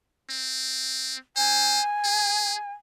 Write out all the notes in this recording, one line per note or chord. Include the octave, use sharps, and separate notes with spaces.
C4
C5 G#5
G#4